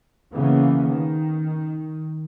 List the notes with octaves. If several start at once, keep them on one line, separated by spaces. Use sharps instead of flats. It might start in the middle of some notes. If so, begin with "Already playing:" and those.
C#3 E3 A#3 B3
D#3